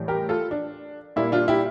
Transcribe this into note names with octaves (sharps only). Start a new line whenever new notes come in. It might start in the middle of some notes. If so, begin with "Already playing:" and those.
Already playing: A2 E3 G3
G4 A#4
F4 A4
D4
A#2 G3 A#3 E4
D4 F4
E4 G4